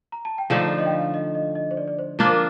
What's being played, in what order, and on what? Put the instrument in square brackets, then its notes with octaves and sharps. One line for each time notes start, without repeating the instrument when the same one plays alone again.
[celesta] A#5
A5
G5
[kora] D3 F3 A3 D#4 [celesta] F5
[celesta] D5
D#5
G5
F5
D#5
D#5
D#5
C5
D5
D5
C5
[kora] F3 A#3 D4 F4 [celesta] C5
[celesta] A#4